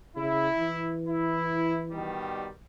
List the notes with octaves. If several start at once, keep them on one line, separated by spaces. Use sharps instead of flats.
C#3 E4
E3
E4
B2 D#3 G3